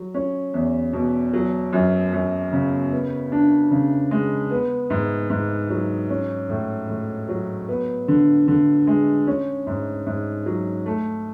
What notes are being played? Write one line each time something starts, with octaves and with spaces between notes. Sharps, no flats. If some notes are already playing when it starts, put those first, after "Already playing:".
Already playing: F#3
C#4
E2
B2
F#3
F#2
F#2
C#3
B3
D4
C#3
G#3
B3
G#2
G#2
F#3
C#4
A2
A2
F#3
B3
D3
D3
G#3
C#4
G#2
G#2
F#3
A3